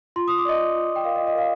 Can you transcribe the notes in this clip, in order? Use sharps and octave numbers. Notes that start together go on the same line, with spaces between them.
F4 C6
F4 D#6
D6
D5 D#5
F4
F4
F4
G5
A#4 F5
D#5
F4
D#5
A#4 F5